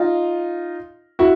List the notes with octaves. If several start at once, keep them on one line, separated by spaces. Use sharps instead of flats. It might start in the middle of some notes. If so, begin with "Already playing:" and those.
Already playing: D#4 F4
E4 F#4